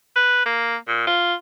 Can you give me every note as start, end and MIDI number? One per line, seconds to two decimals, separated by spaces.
0.16 0.42 71
0.46 0.76 58
0.88 1.07 46
1.07 1.34 65